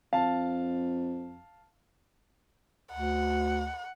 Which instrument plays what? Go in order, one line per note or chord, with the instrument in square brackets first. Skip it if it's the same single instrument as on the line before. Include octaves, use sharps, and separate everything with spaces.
[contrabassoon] F2 [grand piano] F5 A5
[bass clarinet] D2 [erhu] F#5